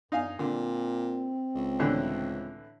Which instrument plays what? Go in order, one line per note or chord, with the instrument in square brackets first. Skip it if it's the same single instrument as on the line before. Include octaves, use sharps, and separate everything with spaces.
[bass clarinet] F#2 [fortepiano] D#4 F5 G#5
[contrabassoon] A#2 [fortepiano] D3 [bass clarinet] C4
[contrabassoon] C#2
[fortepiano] A2 D3 E3